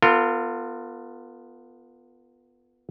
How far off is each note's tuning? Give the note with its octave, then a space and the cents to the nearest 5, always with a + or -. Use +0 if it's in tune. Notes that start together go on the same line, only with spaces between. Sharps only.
B3 +0 F4 +0 A4 +45